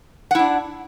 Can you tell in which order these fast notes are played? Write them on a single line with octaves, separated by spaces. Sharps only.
F#5 E4 D4